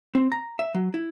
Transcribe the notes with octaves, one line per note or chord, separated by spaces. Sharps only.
C4
A#5
E5
F#3
E4